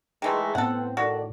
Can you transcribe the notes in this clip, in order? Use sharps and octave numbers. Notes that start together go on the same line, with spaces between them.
D#3 E3 G#3 A3
A2 B3 C4 A4 F#5
D#3 F#4 A4 D5